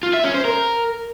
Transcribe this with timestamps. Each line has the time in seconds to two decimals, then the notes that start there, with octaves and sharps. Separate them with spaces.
0.03 F4
0.13 E5
0.24 C#4
0.34 C5
0.45 A#4